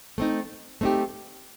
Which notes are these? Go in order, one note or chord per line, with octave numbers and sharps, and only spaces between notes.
A3 C4 D#4
A3 C4 D#4 G4